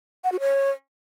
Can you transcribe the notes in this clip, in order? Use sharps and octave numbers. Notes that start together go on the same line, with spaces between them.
F#5
F#4
C#5